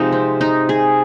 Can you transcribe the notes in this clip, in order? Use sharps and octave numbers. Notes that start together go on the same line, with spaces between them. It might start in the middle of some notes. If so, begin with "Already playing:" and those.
Already playing: C3 F3 G#3 D#4
C4
D#4
G#4